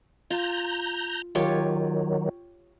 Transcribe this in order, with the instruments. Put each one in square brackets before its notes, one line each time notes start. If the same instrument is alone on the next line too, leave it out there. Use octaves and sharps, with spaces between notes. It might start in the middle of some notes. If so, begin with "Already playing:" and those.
[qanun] F4 [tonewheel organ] A#5 G6
[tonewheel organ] D#3 F#3 [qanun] F4 G4 C#5